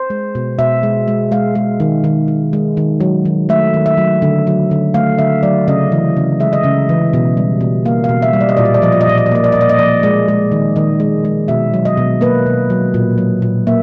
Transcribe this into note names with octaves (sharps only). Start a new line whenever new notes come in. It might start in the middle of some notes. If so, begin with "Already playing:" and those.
Already playing: C5
G#3
B2
B2 E5
G#3
G#3
G#3 F5
G#3
D#3
D#3
G#3
G#3
D#3
F#3
D#3
A3 E5
D#3
E5
F#3
D3
F#3
D3
A3 F5
D3 E5
F#3 D5
C#3 D#5
E3
C#3
G#3 E5
D#5
C#3 E5
E3
B2
G3
B2
A#3 F5
F5
B2
E5
G3
D5
D#5
A#2 D5
D#5
D5
F3 D#5
D5
D#5
A#2 D5
D#5
D5
A#3 D#5
D5
A#2 D#5
D5
D#5
F3 D5
G#3 D5
G#3
D#3
D#3 D#5
G#3
G#3
B2 E5
F#3
D#5
B2
A#3 B4
B2
F#3
A#2
F#3
A#2
A#3 E5